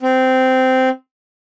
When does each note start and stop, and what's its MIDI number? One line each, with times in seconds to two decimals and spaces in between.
0.01 0.89 60